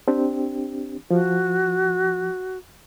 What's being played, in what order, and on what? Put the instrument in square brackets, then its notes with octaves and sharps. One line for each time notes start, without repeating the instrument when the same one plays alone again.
[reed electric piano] C4 D4 G4
[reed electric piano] F3 [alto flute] F#4